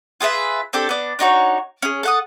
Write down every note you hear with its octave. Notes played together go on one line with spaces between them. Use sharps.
F4 G#4 B4 E5
C4 D4 G4 A4
B3 D4
D4 D#4 F#4 C#5
C#4 G#4
A4 F#5 D#6